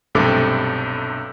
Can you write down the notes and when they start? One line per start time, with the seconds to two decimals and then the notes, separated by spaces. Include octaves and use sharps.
0.15 B1 G2 C3 A3 A4 D6